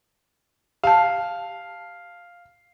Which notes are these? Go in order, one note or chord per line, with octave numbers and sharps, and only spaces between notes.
G4 F5 A5